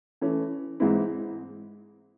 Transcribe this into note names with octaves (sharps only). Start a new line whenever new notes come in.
E3 A3 C#4
G#2 E3 G#3 C4 E4